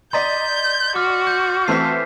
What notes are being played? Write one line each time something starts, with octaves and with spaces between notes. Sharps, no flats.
D5 D#5 A#5 C6 G6 A6 B6
F#4 D6 F6
G6
E3 A3 C4 B6 C7